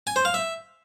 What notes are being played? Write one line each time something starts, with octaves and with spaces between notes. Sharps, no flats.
G#5
C5
F5
E5